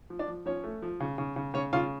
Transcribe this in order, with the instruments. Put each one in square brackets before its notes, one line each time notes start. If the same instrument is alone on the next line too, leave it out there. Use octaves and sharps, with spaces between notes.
[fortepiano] F3
D4 D5
F3
F3 C#4 C#5
A3
F3
C#3
C#3
C#3
C#3 C#4 C#5
C#3 F4 F5